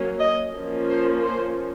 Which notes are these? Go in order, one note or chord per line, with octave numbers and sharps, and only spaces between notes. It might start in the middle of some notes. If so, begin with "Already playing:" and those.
Already playing: F#3 A#3 C#4
D#5
F3 A#3 C#4
C5
C5